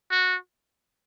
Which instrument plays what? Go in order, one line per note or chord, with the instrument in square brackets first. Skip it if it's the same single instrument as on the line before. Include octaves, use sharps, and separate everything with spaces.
[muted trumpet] F#4